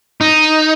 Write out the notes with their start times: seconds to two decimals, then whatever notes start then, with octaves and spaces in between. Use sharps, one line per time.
0.21 D#4